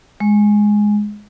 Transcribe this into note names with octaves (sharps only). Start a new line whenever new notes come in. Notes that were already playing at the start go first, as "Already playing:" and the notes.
G#3